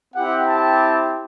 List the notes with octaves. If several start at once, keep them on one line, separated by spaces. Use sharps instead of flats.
C4 E4 G4 F#5
A5